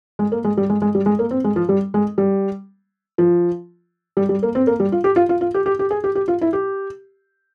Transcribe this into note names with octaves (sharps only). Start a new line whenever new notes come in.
G#3
A#3
G#3
G3
G#3
G#3
G3
G#3
A#3
C4
G#3
F3
G3
G#3
G3
F3
G3
G3
A#3
C4
A#3
G3
F4
G4
F4
F4
F4
G4
G4
G4
G#4
G4
G4
F4
E4
G4